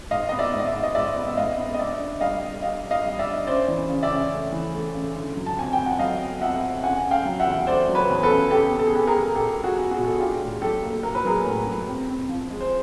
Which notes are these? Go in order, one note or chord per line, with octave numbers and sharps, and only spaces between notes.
G#2 D#5 F5
B3 D#5
D5 E5
G#2
D#5
D5 E5
G#2
D#5
G#2 D5 E5
B3
E5
G#2 D#5 F5
B3
D#5
D4 D5 E5
D4
G3 D#5 F5
G3
D4 D#5 F5
D4
D#5 F5
G3
D5 E5
D4
C#4 C5 D5
E3
C#3
D5 E5
C#4
A3
E3
A3
C#3
D3
F#3
A5
F2 G#5
G5
F2
F#5
F#3 D#5 F5
B3
F2 E5 F#5
F2
C#3 F#5 G#5
C#3
F5 G5
F#3
E5 F#5
E2
A3 C5 D5
F#3
B4 C#5
E2
A4 B4
C#3
B3 G4 A4
B3
A4
G#4
B3 G4 A4
G#4 A#4
G#3
B2 G4 A4
G#3
F#4 G#4
B3
F#4 G#4
B2
A4
G#4
D4 F4 G4
A2
F#3 G4 A4
A#3
A#3 A#4
B4
F#3 G#4 A#4
A2
F#3
C4
C4
F3
G#3
C5